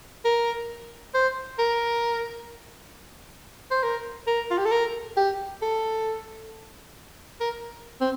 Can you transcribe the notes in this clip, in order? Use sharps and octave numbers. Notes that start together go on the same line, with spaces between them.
A#4
C5
A#4
C5
A#4
A#4
F4
G4
A4
A#4
G4
A4
A#4
C4